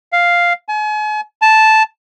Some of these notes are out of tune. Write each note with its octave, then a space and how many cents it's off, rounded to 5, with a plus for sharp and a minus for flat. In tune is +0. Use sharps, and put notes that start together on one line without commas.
F5 +0
G#5 +40
A5 -5